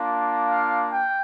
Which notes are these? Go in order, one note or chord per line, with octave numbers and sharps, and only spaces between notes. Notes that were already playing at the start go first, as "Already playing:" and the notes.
Already playing: A#3 D4 F4
F5
G5